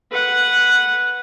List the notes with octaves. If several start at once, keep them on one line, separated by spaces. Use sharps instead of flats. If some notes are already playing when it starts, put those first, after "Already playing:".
B4 F#5